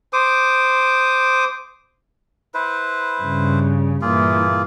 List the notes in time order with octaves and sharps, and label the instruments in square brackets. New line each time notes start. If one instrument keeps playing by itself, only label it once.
[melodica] C5 D6 D#6
E4 B4 C5
[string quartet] G2 C#3
[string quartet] G2 A#2 E3 [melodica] A#3 F4 G#4